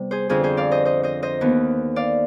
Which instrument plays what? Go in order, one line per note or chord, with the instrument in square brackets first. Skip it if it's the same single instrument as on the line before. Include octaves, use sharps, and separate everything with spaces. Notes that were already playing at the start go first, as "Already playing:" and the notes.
Already playing: [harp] C3 G3 B3
G#4 C5
F2 D3 F3 F4 G#4
G#4 C5
D5 F5
C5 D#5
C5 D#5
C5 D#5
C5 D#5
D#2 D#3 B3
D5 F5